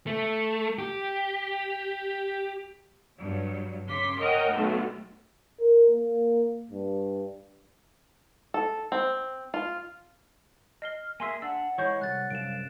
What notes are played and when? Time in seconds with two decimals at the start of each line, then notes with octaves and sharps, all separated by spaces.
0.07 A3
0.78 G4
3.19 G2 F#3
3.87 C#3 C6 D6 B6
4.19 A#4 C#5 D#5 F#5 G5
4.51 B1 D3 A3
5.60 A#4
5.91 A#3
6.71 G2
8.54 A4
8.92 C4
9.54 F4
10.82 D#5 F6 C7 G7
11.20 A#3 G#4 E5 G#5 C6 E6
11.42 D4 F#5 E6
11.78 E3 G#3 C#5 C#6 G6
12.01 C2 F#5 F#6 A6
12.30 C2 F#2 F5 D7 E7